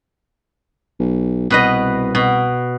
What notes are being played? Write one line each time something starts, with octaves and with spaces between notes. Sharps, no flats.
B1
C2 B2 B4 D#5
B2